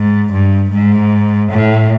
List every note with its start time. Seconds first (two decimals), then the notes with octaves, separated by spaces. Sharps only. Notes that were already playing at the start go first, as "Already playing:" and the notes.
Already playing: G#2
0.32 G2
0.72 G#2
1.51 A2